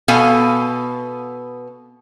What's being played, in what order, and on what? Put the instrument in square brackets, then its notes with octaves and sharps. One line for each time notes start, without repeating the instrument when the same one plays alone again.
[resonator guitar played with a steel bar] B2 B3 A4 F5 G#5